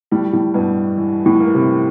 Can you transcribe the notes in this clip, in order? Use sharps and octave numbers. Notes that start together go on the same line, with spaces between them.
A2 G3
A2
G2 B2
E3
A2
A#3
C3